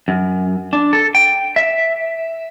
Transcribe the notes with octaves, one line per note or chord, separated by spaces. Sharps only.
F#2
D4
A4
G5
E5